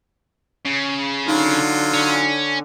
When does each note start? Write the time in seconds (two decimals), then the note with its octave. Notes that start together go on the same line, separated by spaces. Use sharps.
0.65 C#3
1.28 D3 F#3 D#4 F4
1.93 C#4